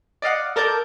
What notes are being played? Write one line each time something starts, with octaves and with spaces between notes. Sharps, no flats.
D5 D#5 F5 F#5
A4 A#4 D5 A5 G6